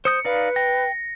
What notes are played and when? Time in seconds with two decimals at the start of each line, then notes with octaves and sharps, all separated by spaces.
0.05 C5 D#6 G6 C#7
0.25 D#4 B4 D5 F5
0.56 G5 A#6